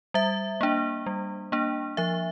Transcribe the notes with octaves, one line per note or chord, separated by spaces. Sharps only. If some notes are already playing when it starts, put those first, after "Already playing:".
G3 E5
A#3 D4
G3
A#3 D4
F3 E5